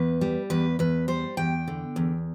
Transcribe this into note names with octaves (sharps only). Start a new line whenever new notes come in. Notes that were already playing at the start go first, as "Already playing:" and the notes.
Already playing: E2 B4
G3
E2 B4
E2 B4
G3 C5
E2 G5
D3
E2